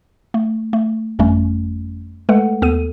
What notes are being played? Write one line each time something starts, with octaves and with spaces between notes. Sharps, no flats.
A3
A3
G1 F2 G3 A3 C#4
G#3 A3 A4 B4 F#5
D#2 B3 A4 D#7